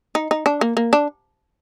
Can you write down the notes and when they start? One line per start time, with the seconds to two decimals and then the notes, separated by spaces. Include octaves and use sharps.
0.15 D#4
0.31 D#4
0.46 D4
0.61 A#3
0.77 A#3
0.93 D4